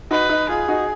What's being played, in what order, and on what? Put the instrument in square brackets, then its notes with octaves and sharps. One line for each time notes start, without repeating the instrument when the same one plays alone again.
[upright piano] D#4 F#4 [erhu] B4
[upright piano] D#4
[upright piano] F4 [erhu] G#4
[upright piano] D#4 F#4